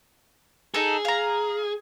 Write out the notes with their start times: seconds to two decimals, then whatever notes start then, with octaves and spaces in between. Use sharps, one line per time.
0.74 D#4 G#4 A4
1.05 F5 A#5